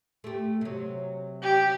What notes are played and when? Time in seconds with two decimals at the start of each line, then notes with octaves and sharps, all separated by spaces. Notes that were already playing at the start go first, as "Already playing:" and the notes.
0.24 A3 G4
0.61 C3 F#3
1.43 G4